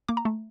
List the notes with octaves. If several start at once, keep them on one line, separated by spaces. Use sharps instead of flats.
A#3 D6
A#5
A3